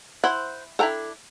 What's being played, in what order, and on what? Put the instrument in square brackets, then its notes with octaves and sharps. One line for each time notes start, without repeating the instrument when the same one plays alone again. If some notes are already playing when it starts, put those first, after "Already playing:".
[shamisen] E4 [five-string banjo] C5 F#5
[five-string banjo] D4 E4 [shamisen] A4 G5 A#5